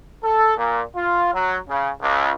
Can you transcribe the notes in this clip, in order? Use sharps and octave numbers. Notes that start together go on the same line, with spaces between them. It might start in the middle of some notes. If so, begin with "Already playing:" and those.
A4
A#2
F4
F#3
C#3
C#2